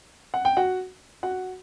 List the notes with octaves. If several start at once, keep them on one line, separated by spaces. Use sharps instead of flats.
F#5
G5
F#4 F#5
F#4 F#5